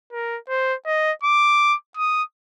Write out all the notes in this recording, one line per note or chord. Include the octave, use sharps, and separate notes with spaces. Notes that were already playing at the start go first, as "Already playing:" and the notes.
A#4
C5
D#5
D6
D#6